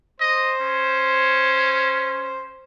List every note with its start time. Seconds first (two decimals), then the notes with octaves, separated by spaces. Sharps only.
0.20 C5 D#5
0.61 C#4